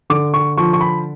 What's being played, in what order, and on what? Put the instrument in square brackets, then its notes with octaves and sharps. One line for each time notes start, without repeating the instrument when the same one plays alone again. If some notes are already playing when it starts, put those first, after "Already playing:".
[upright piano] D3 D6
C#6
F3 C#6
C#6
B5